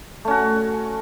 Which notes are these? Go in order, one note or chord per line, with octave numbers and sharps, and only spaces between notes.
A3 C#4 F#4